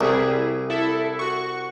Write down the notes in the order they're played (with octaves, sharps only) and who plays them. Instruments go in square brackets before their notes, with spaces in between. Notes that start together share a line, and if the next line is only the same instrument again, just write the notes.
[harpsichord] C2 [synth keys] G3 E4 G#4
[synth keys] E4 A4 E5
F#4 C#6